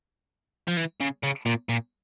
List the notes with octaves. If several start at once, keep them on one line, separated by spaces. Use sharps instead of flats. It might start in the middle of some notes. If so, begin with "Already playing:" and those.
F3
E3
C#3
C#3
A#2
A#2